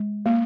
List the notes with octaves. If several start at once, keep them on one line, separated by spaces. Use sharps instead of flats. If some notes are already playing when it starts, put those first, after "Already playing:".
Already playing: G#3
A#3